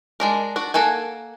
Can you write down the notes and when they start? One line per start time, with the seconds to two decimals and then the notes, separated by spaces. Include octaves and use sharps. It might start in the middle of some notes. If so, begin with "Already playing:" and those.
0.20 G#3 D4 A#4
0.56 D4 F#4
0.74 A#3 A4 F#5 G#5